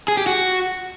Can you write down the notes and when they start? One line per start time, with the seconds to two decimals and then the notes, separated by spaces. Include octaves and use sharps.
0.08 G#4
0.17 G4
0.26 F#4